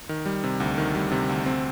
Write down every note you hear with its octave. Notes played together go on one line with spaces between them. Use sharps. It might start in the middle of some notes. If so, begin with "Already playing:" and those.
D#3
G3
C3
D2
D#3
G3
C3
D2
C4